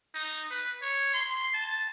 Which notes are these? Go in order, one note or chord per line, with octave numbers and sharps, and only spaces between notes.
D#4
B4
C#5
C6
A5